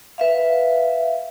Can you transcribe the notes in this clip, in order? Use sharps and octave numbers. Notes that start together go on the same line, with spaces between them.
B4 E5 F5